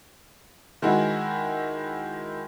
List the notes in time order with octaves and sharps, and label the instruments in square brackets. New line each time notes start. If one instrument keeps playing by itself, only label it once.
[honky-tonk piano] D#3 G#3 E4 F#4